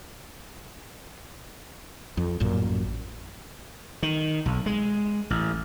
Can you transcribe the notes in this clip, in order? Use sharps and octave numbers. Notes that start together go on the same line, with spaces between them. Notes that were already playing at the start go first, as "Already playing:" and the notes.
F2
A1 F#2 A#2
D#3
B1
G#3
A1